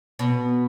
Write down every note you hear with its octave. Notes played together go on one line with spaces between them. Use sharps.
B2